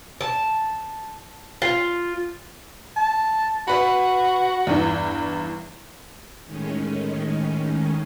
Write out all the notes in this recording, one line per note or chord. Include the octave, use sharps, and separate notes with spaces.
A5
F4
A5
F#4 B4 B5
E2 G2 E3
A2 D#3 G#3 C#4